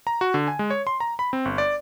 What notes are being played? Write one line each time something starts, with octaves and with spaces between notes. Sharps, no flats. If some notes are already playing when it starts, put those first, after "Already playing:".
A#5
F#4
D3
G#5
G#3
C#5
C6
A#5
B5
C4
G1
D5